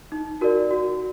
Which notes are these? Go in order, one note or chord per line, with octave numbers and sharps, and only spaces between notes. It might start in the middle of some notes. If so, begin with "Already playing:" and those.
D#4
F#4 A#4 D5
F#4